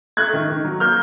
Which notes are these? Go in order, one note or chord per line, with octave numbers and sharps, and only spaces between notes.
A3 F#6 G#6
D#3
D#3
F#3
A#3 F6 G6